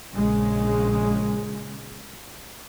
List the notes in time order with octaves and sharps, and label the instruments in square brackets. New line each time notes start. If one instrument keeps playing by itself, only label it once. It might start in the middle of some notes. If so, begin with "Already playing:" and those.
[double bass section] A#1 C#3 G#3